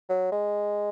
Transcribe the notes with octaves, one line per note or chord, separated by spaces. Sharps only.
F#3
G#3